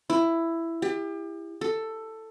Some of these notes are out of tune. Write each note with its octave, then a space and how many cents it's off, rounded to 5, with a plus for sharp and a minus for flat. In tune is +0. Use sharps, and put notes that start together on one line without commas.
E4 +10
G4 +35
A4 +10